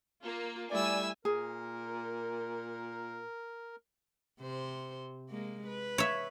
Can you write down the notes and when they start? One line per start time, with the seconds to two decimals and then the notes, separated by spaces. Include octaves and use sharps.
0.23 A#3 F4
0.71 G3 A3 E4 D5 G#5 E6
1.25 A#2 G#4 A#4
4.40 C3 C5
5.29 G#3 A#3
5.67 B4
5.98 C#5 E5